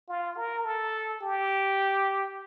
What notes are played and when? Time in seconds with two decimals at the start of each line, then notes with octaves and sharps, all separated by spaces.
0.09 F4
0.37 A#4
0.65 A4
1.22 G4